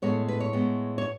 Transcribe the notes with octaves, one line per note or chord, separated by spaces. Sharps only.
A2 G#3 B3 C#5
B4
C#5
A2 G#3 B3
C#5